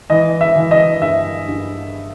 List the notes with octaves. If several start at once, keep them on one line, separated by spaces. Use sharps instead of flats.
E3 D#5
E5
E3
D#5
G2 E5
G2